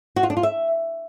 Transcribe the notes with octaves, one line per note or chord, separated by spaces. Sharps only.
F#4
F4
D4
F4
E5